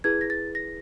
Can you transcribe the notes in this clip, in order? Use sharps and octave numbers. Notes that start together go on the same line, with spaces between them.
E4 G#4 B4 G#6
A#6
A6
A#6